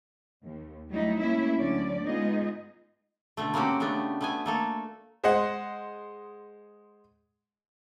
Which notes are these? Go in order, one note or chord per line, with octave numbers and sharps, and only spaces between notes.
D#2
F#3 G3 A3 D#4 E4
A3 A#3 C#4 E4 E5
D2 D3 F#3 C#4 D5
G#3 B3 D#4 F4 G#4 D#5
B2 D3 A3
A#3 C4 C#4 F#4 G4
C#3 A3 B3 D4
A3 B3 G#5
A3 A#3 A4
G#3 C5 D#5 F#5